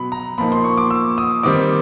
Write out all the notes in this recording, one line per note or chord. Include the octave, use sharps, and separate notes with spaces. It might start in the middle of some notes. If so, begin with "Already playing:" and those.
Already playing: B2 F#3 B3 B5
A#5
A#2 F3 A#3 D#4 B5
C6
C#6
D6
E6
D#6
D#3 G3 C4 D#4 D6